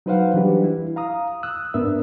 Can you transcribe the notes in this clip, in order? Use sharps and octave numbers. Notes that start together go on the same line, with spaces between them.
F#3 D#4 B4 C5 F5 F#5
E3 F#3 G3 D4 G4 B4
E4
F5 A#5 D#6
D#6 E6 F#6
G#2 B3 D4 A#4 E5 E6